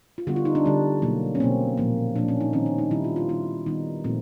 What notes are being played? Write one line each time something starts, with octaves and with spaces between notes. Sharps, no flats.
F4
D3 G3 B3 F#4
F4
D#4
D4
D3 G3 B3
B2 F#3 A#3
C#4
B2 F#3 A#3 C4
A#2 F3 A#3
A#2 F3 A#3 D4
C#4
D#4
D#3 G3 C4 C#4
D4
D#4
D#3 G3 C4 E4
F4
F4
D#3 G3 B3 E4
D#3 G3 B3 D#4
A#2 F3 A3 C4